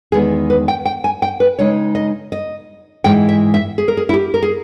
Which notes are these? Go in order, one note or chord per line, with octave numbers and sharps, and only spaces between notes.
E2 D#3 G#3 B3 G#4
B4
G5
G5
G#5
G5
B4
C#3 G#3 D#4 C#5
D#5
D#5
G#2 E3 G#3 G5
E5
E5
G#4
A#4
G#4
E4
G4
A#4
G#4